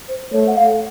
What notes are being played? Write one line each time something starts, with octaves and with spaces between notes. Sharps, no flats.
C5
A3 C#5
F#5
F5